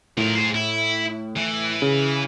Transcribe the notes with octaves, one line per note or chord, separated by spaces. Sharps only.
A2 F3 A#4
G#4 C5
E4
E3
C#3